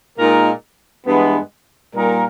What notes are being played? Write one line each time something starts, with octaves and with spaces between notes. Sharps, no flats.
A#2 G#3 D#4 A#4
G2 E3 G#3 B3
A#2 G3 A#3 D#4 A#4